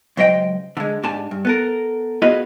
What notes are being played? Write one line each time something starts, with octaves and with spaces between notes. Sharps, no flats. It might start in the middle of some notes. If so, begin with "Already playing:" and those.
C#2 F#3 C5 D#5 G5
D3 G#3
G#2 D4 G4 G#5 A5
G2
B3 A4 A#4
B3 F4 F#4 G#4 B4 D#5